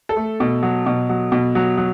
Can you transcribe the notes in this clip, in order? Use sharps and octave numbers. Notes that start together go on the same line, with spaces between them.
A4
A3
B2
F#3
B2
F#3
B2
F#3
F#3